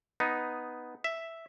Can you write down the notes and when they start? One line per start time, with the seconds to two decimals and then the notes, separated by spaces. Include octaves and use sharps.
0.20 B3 D#4
1.04 E5